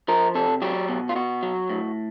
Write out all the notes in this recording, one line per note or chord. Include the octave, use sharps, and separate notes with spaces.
F3 A#4
C3 A4
F#3 G4
B2
F4
B2 F#4
F#3
A2